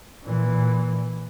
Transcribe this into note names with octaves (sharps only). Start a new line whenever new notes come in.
A#2 E3